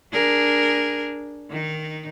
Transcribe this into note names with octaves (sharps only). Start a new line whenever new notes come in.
D4 G#4 A#4
D#3 D#4